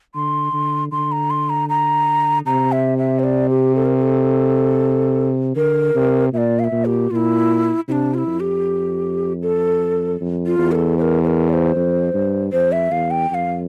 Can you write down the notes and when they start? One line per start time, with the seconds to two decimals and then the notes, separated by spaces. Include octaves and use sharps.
0.15 D3 C6
0.53 D3
0.92 D3 C6
1.12 A#5
1.30 C6
1.50 A#5
1.69 A#5
2.46 C3 A#5
2.72 E5
2.98 E5
3.19 C5
3.24 D5
3.50 G4
3.75 A4
3.85 A#4
3.96 A#4
4.01 A4
5.56 D3 A#4
5.95 C3
6.33 A#2 E5
6.38 D5
6.59 F5
6.64 E5
6.72 A#2
6.85 G4
7.11 A#2 E4 F4
7.88 C3 D4 E4
8.14 F4
8.18 E4
8.27 F2
8.40 G4
9.43 A4
10.21 F2
10.46 F4
10.59 E2
10.72 A#4
10.75 A4
10.98 C5
11.02 A#4
11.24 C5
11.27 A#4
11.49 D5
11.53 C5
11.75 F2
12.14 G2
12.52 F2 C5
12.72 E5
12.91 E2 F5
13.11 G5
13.30 F2 F5 G5